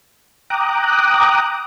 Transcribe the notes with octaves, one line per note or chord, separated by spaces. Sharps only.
G5 A#5 D6 D#6 F#6